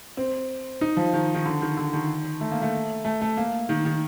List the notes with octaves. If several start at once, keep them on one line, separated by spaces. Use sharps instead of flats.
C4
D#4
F3
D#3
D#3
D3
D#3
D3
D#3
A3
A#3
A3
A3
A3
A#3
D#3
D#3